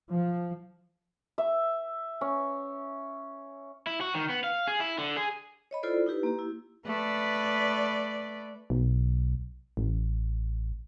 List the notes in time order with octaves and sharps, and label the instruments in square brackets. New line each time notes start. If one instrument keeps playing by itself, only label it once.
[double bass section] F3
[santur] E5
C#4
[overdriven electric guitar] E4
F#4
D#3
B3
F5
G#4
E4
D3
G#4
[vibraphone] C#5 D#5 B5
E4 F4 A4 C5 D5
D#4 E4 G4 B4
A#3 G4
E4
[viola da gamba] A3 B4 D5
[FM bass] B1
A1